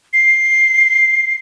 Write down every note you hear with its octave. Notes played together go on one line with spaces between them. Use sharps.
C7